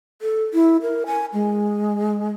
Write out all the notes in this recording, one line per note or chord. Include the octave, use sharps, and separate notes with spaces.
A4
E4
A#4
G#5
G#3